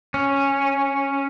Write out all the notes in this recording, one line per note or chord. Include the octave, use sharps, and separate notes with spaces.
C#4